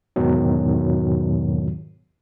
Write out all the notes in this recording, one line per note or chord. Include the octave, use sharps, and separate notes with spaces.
E2 G#2 B2 D#3 F#3